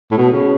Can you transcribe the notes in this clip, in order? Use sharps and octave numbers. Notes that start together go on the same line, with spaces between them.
A2
B2
C#3